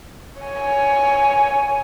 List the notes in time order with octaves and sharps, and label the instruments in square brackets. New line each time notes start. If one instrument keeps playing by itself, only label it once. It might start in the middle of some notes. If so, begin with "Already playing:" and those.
[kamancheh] C#5 G#5